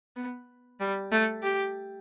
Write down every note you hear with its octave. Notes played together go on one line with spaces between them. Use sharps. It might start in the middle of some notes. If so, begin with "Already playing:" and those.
B3
G3
A3
G4